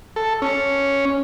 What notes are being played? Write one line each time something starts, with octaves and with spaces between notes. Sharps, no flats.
A4
C#4